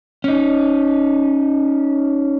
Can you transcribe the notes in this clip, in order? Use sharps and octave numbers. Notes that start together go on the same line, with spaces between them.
C#4 D#4